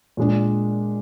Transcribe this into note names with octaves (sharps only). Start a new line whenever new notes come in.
A#2 G#3 D4